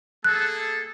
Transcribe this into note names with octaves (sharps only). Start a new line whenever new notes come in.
A#3 G#4 A4 F#6